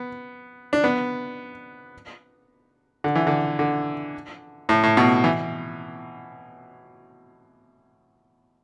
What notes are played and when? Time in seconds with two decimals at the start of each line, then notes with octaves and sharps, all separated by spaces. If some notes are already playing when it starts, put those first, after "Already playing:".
Already playing: B3
0.73 D4
0.84 B3
3.04 D3
3.15 E3
3.27 D3
3.59 D3
4.69 A2
4.83 A2
4.97 B2
5.24 E3